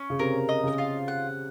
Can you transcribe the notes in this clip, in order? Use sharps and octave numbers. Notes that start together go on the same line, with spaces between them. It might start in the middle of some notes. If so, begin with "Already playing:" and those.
Already playing: C#4
C#3
C3 A#4
D#5
C#3
F4
F#5